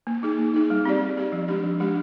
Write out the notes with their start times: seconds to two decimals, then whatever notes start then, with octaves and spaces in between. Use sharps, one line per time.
0.07 A#3
0.23 D#4 G#4
0.38 A#3
0.54 D#4 G#4
0.70 G3
0.85 C4 G4 D5
1.01 G3
1.17 C4 G4 D5
1.32 F3
1.48 G#3 D4 G4
1.63 F3
1.80 G#3 D4 G4